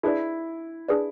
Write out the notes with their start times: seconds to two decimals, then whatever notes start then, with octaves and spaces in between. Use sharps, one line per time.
0.03 D4 E4 G#4 B4 D5
0.88 D4 G#4 B4 D5